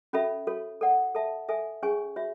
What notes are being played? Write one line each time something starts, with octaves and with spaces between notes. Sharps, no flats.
C#4 F#4 A4 E5 B5
F#4 A4 C#5
A4 D5 F#5
A4 E5 A5
A4 E5 G#5
C#4 G#4 C#5 G#5 C#6
F#4 C#5 E5